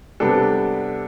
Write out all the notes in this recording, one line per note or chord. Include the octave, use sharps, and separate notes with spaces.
C3 G3 B3 D4 A4